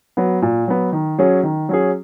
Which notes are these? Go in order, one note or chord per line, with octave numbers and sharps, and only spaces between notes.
F#3 B3
A#2
F#3 B3
D#3
F#3 C#4 G#4
D#3
F#3 C#4 G#4